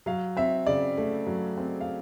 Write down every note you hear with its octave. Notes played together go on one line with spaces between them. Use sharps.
F#3 F5
C4 E5
C#3 D5
A3
F#3
C4
F5